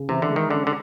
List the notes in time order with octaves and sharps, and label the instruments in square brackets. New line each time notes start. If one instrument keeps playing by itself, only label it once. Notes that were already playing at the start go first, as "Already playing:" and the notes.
Already playing: [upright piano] C#3
[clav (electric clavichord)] C3 [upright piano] E3
[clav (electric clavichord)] D3
[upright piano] G#3
[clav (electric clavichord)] D#3
[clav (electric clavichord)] D3 [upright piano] C#4
[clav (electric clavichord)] D3